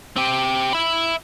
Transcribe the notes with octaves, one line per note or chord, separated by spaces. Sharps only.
C4 G4
E5 B5